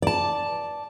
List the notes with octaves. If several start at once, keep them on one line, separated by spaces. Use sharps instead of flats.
D5 A5